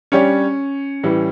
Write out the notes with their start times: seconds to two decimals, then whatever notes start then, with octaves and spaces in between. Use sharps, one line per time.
0.12 G3 C#4 D4 G4 C#5
1.03 A2 E3 G3